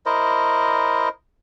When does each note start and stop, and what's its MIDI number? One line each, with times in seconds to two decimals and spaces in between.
0.06 1.09 64
0.06 1.09 70
0.06 1.09 72
0.06 1.09 75